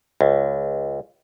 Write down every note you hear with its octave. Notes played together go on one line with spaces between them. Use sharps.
C#2